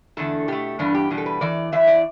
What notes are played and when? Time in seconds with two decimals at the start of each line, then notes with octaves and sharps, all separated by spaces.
0.17 E2 D3 A3 A4
0.48 B2 A3 G4
0.79 G2 E3 B3 D4
0.94 G4
1.10 E2 B2 G3
1.18 A4
1.26 B4
1.41 E2 E3 D5
1.72 E2 E3 E5
1.87 D5